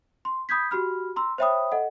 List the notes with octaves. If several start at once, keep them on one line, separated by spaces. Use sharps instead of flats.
C6
B5 D#6 G6 G#6 B6
F#4 G4 B5 F6
A#5 C6 E6
C5 C#5 E5 G5 B5 D#6
A4 D#5 F#5